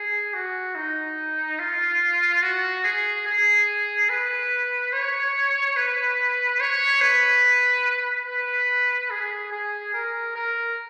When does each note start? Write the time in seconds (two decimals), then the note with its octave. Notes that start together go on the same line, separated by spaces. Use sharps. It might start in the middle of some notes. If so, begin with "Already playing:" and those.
Already playing: G#4
0.34 F#4
0.75 D#4
1.59 F4
2.42 F#4
2.84 G#4
3.27 G#4
4.10 B4
4.93 C#5
5.76 B4
6.61 C#5
7.02 B4
8.27 B4
9.11 G#4
9.53 G#4
9.94 A#4
10.36 A#4